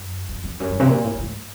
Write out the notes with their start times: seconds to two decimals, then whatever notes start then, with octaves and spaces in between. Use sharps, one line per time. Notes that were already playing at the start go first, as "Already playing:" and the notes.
Already playing: F#2
0.29 F2
0.44 F2
0.60 F#2
0.69 G2
0.80 C3
0.89 A#2
1.04 A2
1.14 A2
1.19 G#2